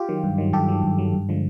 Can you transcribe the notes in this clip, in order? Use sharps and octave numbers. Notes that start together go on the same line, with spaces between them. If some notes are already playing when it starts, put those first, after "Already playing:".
Already playing: F4 G4
D#3 F#3
G2
D#3 F#3
G2 G4 A4
D#3 F#3
G2
D#3 F#3
G2
D3 F3 G#3